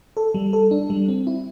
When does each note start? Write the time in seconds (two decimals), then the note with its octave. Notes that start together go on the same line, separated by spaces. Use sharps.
0.17 A4
0.34 G3
0.53 A4
0.71 D4
0.90 G3
1.08 C4
1.27 E4